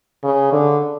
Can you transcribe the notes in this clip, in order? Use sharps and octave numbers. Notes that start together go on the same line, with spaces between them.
C#3
D3